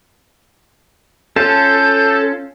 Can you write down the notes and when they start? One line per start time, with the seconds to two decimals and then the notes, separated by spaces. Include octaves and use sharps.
1.36 C#4 F4 A4 G6